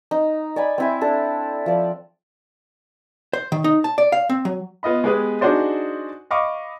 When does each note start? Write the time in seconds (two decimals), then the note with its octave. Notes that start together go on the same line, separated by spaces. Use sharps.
0.11 D#4
0.56 D5 G#5 B5
0.78 C4 E4 G#5
1.01 D4 A4
1.66 F3 D5
3.33 C5
3.52 D#3
3.64 D#4
3.84 A5
3.98 D5
4.12 F5
4.30 C4
4.45 F#3
4.83 B3 F4 D#5 B5
5.04 G#3 B3 G4 G#4 B4
5.41 D4 D#4 F#4 G#4 C5 D5
6.31 D#5 F5 B5 C#6 D6